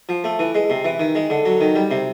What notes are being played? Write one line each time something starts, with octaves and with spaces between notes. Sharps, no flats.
F3
A3
E3
G#3
C3
E3
D#3
G#3
D3
F#3
D#3
G3
C3